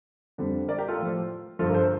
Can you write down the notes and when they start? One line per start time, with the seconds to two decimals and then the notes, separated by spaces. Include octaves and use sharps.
0.38 F2 D3 G3
0.68 A#4 D5
0.78 G4 A#4
0.88 F4 A4
0.99 A2 F3
1.59 G2 D3 F3 F4 A4
1.69 A#4
1.74 A4 C5